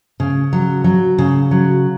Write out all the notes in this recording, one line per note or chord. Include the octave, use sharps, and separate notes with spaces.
C#3
F#3
F#3
C#3
F#3